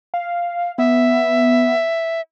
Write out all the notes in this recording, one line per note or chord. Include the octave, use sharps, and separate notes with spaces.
F5
B3 E5